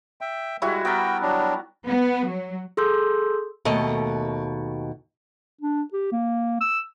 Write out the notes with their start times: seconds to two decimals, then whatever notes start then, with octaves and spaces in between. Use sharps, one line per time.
0.21 E5 G5
0.62 G3 G#3 E4 F#4
0.85 B3 F#4 A#4 G5
1.22 F#3 D4
1.88 B3
2.28 F#3
2.77 G#4 A4 C6 E6 G6
3.65 D#2 B2 A3 D#5
5.61 D4
5.93 G4
6.12 A#3
6.61 E6